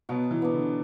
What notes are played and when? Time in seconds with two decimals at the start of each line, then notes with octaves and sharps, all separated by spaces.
0.09 B2 F#3 B3
0.31 E3
0.42 B3 D4
0.53 D3